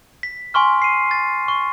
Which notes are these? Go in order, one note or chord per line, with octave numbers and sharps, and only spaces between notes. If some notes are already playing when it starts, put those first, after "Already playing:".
B6
G#5 C6 C#6 F6
C7 D#7
A6
C#6